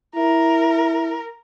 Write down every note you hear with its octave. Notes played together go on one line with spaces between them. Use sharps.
E4 A#4